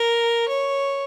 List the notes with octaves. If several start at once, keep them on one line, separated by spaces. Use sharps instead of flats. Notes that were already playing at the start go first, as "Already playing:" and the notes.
Already playing: A#4
C#5